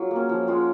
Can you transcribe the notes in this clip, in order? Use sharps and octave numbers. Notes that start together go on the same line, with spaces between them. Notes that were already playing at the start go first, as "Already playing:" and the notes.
Already playing: F#3 F4 G#4
A#3 C#4
F3
G#3 C#4 F4